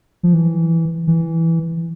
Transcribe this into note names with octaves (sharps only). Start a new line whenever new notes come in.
F3
E3
E3